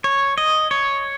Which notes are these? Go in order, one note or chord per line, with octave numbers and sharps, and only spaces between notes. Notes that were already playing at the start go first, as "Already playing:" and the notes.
C#5
D#5
C#5